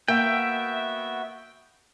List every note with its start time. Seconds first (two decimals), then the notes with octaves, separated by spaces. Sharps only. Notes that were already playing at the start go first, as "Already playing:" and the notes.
0.08 A#3 B3 F#4 E5 G5